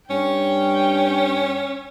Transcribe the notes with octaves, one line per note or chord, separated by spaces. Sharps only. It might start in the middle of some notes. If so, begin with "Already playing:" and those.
G2 C#4 G5